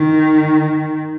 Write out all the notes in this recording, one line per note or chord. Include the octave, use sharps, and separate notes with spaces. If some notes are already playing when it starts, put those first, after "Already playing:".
Already playing: D#3